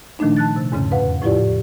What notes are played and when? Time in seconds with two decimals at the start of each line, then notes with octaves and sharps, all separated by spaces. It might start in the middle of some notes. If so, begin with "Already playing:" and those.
0.19 A#2 D#3 F3 A3 D4 D#4
0.37 A5 F#6 A6
0.56 C3
0.72 E2 G#2 C#3 C#4
0.91 F2 B4 F5 F#5
1.22 A2 F3 E4 F4 G4 D5